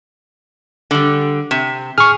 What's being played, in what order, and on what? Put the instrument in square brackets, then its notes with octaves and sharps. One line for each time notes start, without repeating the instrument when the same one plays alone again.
[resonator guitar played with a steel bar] D3 G3
C3
[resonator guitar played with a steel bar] G#4 [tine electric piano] C#6 F6